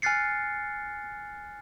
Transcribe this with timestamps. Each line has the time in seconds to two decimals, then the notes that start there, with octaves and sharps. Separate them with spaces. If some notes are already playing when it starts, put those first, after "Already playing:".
0.02 G#5 F6 F#6 A6 C7 C#7